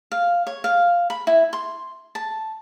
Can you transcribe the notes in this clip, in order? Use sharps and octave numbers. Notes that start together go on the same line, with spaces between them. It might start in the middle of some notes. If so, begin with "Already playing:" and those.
F5
C#5
F5
B5
E4
C6
A5